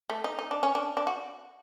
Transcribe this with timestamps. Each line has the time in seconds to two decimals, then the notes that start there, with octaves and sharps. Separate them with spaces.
0.10 A3
0.24 D#4
0.39 D#4
0.51 D4
0.63 C#4
0.75 D4
0.97 D4
1.07 F#4